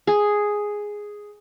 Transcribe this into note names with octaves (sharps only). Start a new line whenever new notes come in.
G#4